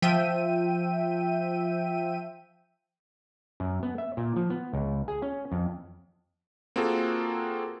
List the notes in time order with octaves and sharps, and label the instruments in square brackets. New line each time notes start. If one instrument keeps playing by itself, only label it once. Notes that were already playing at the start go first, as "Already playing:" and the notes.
[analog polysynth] F3 E5 G5 D#7
[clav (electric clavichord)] F#2
B3
E5
A#2
F3
B3
C#2
G#4
C#4
F2
[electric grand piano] A#3 C4 F4 F#4 G#4 A4